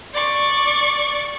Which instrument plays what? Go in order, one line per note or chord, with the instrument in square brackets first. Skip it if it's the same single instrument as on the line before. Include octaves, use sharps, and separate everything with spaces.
[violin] D5 C#6